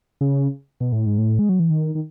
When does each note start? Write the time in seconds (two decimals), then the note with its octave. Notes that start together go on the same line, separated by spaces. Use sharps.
0.21 C#3
0.80 B2
0.92 A2
1.06 G#2
1.18 A2
1.39 G#3
1.49 F#3
1.60 E3
1.70 D#3
1.95 D#3